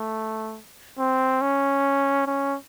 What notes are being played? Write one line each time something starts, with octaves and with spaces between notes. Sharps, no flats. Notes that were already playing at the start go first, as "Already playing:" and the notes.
Already playing: A3
C4
C#4
C#4